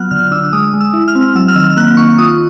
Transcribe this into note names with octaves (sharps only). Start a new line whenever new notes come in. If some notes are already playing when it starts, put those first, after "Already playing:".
Already playing: F#3 B3 F4 F6 F#6
D3 F6
D4 E6
G#3 D#6
G#3
E6
E4
F6
C4
F#3 E6
F6
D#3 E6
A#3 F#6
D#3 C#6
F4 D#6